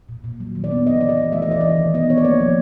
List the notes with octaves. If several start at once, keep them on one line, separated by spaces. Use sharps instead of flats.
A#2
A#2
F#3
D#3
D5
B3
E3 D#5
C#3 D5
D#5
E3
A3 E5
D#5
E3 D5
E3 D#5
D#3
B3 D#5
B3 C#5
D5
A#3 C#5
F3